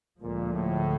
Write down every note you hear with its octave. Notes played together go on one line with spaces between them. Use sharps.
D2 A#2 D3 F3 G#3
A2